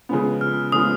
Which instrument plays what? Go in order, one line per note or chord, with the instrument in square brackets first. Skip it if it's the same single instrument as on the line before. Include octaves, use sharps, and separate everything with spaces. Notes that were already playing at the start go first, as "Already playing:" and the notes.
[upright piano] C#3 F3 G#3 B3
[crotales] F6
[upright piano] C#3 F3 G#3 B3 [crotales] D#6